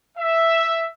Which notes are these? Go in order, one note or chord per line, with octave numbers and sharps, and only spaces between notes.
E5